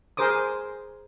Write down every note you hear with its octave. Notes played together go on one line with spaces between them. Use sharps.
G#4 A#4 C5 D6 D#6